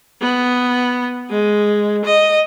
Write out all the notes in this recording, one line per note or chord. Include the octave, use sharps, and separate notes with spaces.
B3
G#3
D#5